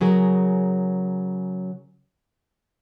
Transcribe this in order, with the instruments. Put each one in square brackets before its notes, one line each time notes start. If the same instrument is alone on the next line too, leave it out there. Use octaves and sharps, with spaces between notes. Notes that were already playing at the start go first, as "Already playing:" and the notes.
[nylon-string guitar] C#3 F#3 G#4 A#4